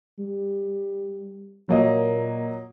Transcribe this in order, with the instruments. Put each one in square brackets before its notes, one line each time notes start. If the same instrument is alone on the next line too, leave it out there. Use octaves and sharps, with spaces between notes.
[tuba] G3
[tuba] A#2 [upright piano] F#3 A#3 D#5